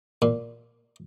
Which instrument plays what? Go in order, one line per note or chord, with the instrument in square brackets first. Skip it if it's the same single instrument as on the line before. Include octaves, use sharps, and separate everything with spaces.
[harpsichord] A#2